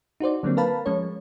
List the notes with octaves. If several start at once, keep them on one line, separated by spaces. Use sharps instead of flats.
D#4 F#4 C5 D5
D3 F#3 G3 A#3 C4
A#4 B4 F5 A5 B5
F3 G#3 C#4 C#5